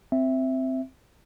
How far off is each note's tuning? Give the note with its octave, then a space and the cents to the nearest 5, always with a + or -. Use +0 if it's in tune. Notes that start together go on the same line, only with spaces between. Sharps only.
C4 -5 E5 +0